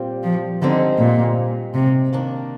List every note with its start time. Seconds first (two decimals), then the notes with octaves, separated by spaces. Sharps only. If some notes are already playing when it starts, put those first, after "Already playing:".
Already playing: A#2 G3 C4 F4
0.23 F3
0.62 G#2 D3 G3 C4 D#4
0.99 A#2
1.74 C3
2.13 D#3 A#3 D4